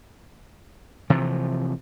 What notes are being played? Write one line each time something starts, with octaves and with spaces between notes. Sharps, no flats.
C3 E3 F3